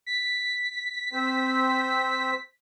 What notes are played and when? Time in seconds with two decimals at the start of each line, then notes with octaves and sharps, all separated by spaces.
0.06 B6
1.13 C4 C5